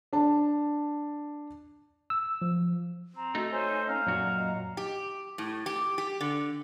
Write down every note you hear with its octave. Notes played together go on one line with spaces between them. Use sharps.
D4 A5
E6
F3
C4 A#5
A3 D#4 F#4
C5 C#5 G#5
C#4 F5 A#5
F#2 A#2 F#4 D5
D#5
G4
A2
G4
G4
D3